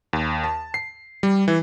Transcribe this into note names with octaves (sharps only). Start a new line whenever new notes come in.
D#2
A5
C7
G3
E3